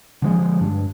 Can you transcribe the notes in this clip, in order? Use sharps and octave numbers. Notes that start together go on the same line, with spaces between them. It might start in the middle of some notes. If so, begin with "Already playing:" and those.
D3 F3 G#3
G2 D4